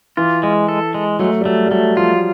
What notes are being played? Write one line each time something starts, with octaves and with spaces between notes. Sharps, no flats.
E3 F4
G#3
A4
G#3
F#3 A3
G3
F#3 A3
G3
F#3 A3
F3 F4